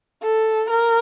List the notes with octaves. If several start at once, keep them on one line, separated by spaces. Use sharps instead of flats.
A4
A#4